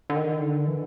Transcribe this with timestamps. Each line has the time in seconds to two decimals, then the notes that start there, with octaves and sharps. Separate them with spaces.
0.10 D3
0.16 D#3
0.41 D3
0.68 E3